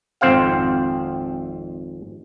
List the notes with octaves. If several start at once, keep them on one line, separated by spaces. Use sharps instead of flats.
G#1 F2 C4 C5 F5 F#5